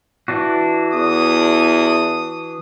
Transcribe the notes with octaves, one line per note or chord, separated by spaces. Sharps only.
E3 D4 F#4
E2 D#6